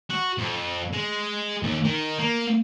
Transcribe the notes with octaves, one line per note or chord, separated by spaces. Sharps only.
F#4
F2
G#3
D#2
D#3
A#3